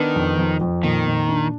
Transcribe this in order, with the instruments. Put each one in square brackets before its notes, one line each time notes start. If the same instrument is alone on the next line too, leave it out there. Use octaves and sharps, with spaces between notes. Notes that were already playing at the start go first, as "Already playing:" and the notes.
Already playing: [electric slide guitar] D#3 [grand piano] B3 D4
[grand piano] F2
F3
F2
[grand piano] A#2 [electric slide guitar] D#3
[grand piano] A#2
D4